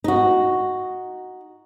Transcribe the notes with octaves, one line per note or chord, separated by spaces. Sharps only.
D#4 F#4